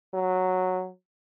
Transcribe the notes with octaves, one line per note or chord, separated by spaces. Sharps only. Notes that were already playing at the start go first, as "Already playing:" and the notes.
F#3